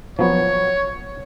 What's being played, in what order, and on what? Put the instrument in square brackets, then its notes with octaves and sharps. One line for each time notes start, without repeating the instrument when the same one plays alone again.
[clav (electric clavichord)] F3 F#3 B3 [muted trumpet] C#5